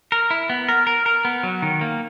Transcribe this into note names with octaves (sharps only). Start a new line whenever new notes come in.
A#4
E4
B3
A#4
A#4
A#4
B3
F#3
D#3
A#3